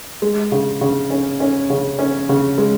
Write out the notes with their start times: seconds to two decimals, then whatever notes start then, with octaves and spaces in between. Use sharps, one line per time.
0.22 G#3
0.52 C#3
0.81 C#3
1.10 C#4
1.40 C#4
1.70 C#3
1.99 C#4
2.29 C#3
2.58 G#3